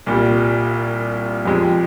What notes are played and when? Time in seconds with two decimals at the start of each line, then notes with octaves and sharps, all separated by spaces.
0.06 C2 A#2 G3
1.45 F2 C3 F3 G#3